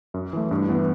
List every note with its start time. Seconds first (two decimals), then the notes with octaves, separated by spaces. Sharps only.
0.14 F#2
0.33 E3 A3
0.51 G2
0.69 E3 B3